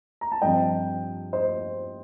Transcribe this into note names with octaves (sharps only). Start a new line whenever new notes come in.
A#5
A5
G2 F3 C4 D#5 G5
C5 D#5